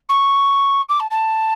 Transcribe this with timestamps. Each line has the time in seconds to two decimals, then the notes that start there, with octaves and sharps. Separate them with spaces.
0.09 C#6
0.89 D6
1.00 A5
1.10 A5